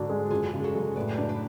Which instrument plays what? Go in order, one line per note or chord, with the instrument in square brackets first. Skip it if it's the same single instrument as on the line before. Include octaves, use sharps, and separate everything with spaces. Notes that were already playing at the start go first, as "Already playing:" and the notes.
Already playing: [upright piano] G#2 D3 D4 [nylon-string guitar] F#4 A4
[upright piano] G#3
[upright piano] F#1 [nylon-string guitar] F4 G#4
[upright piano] C#3
[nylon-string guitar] F#4 A4
[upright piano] F#2
[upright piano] A2 [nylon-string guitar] B4 D5
[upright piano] D4
[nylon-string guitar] B4 D5